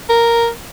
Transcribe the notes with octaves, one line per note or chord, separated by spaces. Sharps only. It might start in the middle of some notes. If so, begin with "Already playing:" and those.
A#4